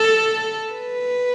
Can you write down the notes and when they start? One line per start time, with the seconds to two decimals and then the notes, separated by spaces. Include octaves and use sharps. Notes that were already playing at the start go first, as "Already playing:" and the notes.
Already playing: A4
0.72 B4